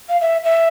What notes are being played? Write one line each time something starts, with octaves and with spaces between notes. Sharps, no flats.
F5
E5
E5